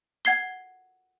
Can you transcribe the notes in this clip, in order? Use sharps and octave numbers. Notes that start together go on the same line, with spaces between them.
F#5 G#6 C7 G7